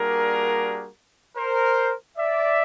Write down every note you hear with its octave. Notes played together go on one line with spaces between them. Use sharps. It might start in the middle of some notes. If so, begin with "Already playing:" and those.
Already playing: G3 A#3 D4 F#4 G#4 A#4
A#4 C5
D5 E5